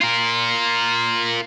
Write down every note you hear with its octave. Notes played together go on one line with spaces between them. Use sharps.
F4 A#4